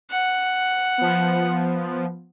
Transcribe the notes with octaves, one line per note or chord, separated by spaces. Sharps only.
F#5
F3 B3